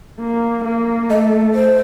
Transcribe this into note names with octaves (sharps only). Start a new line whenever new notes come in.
A#3
A#3
A3 D#5
C5